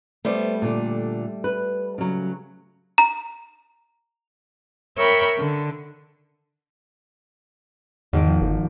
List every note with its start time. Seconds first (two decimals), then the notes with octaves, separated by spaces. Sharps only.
0.25 G3 A3 B3 C5 D5
0.62 A#2 D3
1.44 B4
1.98 C#3 F#3
2.98 A#5
4.96 A#4 C#5 E5 G5 B5
5.38 D3
8.13 G#1 E2 D#3 D7
8.27 F3
8.41 G1